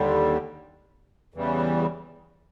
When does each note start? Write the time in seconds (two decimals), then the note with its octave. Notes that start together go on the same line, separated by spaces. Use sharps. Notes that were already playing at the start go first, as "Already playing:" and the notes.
Already playing: D#2 D3 G3
1.34 E2 C#3 E3 G3